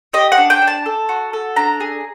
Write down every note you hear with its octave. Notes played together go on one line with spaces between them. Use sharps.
G4 D#5
F#5
D4
G5
D4
A5
A4
F#4
A4
D4 A#5
G#4